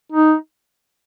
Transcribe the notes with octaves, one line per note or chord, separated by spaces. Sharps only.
D#4